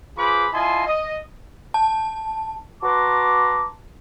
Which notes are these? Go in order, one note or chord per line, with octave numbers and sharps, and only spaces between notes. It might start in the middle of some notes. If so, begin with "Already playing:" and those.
F4 G#4 B4 C5 B5 D6
E4 F4 D#5 G#5 A5 C6
D#5
A5
F#4 B4 A5 A#5 C6 D6